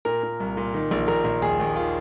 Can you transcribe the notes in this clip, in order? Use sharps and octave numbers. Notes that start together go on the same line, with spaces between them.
A#2 A#4
A#2
C2
A#2
D#3
A#1
A#1 A#4
A#1
D#2 G#4
D#2
D#3 F4